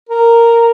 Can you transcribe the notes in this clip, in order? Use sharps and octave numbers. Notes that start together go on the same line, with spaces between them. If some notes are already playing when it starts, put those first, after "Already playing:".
A#4